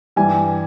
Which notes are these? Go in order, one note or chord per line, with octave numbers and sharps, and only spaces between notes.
G2 E3 G3 G#5